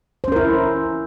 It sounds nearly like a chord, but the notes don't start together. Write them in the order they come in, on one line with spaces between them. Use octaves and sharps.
C5 C#4 A#4 E4